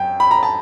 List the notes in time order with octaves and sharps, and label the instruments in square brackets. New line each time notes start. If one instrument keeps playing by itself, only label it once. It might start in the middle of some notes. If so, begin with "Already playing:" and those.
Already playing: [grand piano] F#2 G5
B5
A#5
A5